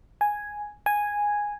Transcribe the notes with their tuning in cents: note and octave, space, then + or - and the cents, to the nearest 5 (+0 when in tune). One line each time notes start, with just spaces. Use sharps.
G#5 +0
G#5 -5